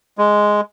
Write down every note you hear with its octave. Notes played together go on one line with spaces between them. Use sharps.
G#3